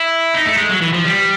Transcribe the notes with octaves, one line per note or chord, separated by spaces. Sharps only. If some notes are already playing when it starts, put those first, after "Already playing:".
Already playing: E4
D#4
A3
G#3
F#3
E3
F3
G3